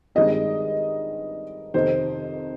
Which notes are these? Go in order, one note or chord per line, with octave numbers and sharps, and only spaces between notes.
G2 D#3 G#3 C4 D#5
F2 C3 D#3 C5